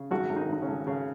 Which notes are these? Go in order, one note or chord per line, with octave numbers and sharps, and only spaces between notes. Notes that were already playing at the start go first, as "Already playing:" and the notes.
Already playing: C#3
G#1 F#3 F#4
G#1
D#3 D#4
G#1 D#4
C#3 C#4
G#1
G#1 C#3 C#4